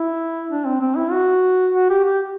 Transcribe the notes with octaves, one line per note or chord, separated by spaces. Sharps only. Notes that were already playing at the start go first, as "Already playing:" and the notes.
Already playing: E4
D4
C4
C4
E4
F#4
F#4
G4
G4